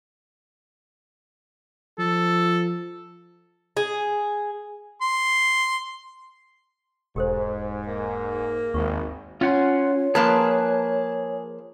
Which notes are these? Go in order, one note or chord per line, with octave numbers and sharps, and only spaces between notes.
F3 A4
G#4
C6
E1 G#2 G4 A4 C5
A#3
G#1 D#2 F#4 C#6
C#4 F4 C#5 F#5 C6
F3 A#3 G#4 B4 A5 F#6